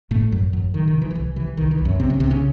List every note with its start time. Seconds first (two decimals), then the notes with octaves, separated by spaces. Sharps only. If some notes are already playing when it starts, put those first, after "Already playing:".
0.11 A1 A2 A3
0.32 A1 F#2 F#3
0.53 A1 F#2 F#3
0.74 C3 D#3
0.88 D#3
0.95 C3
1.02 E3
1.11 D#3
1.15 C2 E3
1.36 C3 E3
1.57 C2 D#3
1.71 E3
1.78 C2
1.85 F#2 F#3
1.99 C2 C3 C4
2.10 C#3 C#4
2.20 C2 C3 C4
2.30 C#3 C#4